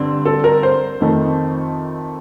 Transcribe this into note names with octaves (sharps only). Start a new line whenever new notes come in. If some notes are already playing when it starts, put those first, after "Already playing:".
Already playing: G2 D3 C4
A4
A#4
C5
F2 D#3 A3 C4